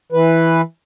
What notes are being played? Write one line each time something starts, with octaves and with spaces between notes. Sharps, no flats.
E3 B4